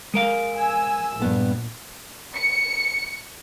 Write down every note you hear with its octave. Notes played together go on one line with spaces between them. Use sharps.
G#3 A#4 F5
G#5 E6
A#1 G2 B3 A5
C#7